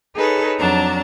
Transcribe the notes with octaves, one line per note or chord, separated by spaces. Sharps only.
D#4 G#4 A4 B4 C#5
F2 F#3 D4 A5 A#5